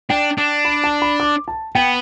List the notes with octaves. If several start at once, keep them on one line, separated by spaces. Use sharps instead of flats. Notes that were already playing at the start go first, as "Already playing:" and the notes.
D4 G5
D4
B5
A5
B5
D6
A5
B3 G5